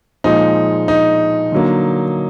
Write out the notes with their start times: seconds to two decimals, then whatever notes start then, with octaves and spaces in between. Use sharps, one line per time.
0.24 A#2 F3 G#3 D#4
0.88 D#4
1.52 D3 F#3 A#3